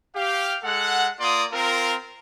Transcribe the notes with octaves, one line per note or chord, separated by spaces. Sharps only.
G4 F5
G#3 A4 F#5
A#3 F4 D5 C6 D#6
C4 F4 A#4